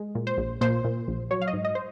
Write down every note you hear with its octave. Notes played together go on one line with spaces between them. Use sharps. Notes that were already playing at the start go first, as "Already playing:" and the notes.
Already playing: G#3
A#2
C5
A#1
A#2 C5
A#2
A#1
F#3 C#5
F5
D#5
G#2
D#5
C5